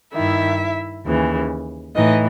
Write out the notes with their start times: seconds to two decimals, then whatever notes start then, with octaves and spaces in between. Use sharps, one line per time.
0.14 G2 D#3 E4 E5
1.05 D#2 C#3 E3
1.95 A2 E3 D#4 D#5